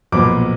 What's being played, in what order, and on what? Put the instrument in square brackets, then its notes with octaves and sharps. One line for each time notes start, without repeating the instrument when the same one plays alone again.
[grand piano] B1 A#2 F3 B3 D6